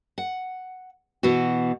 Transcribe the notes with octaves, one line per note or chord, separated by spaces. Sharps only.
F#5
B2 E3 B3 F#4